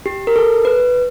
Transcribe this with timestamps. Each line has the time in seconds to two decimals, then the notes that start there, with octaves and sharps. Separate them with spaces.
0.06 G4
0.27 A#4
0.36 A4
0.65 B4